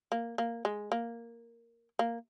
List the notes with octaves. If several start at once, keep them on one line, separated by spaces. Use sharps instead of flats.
A#3
A#3
G#3
A#3
A#3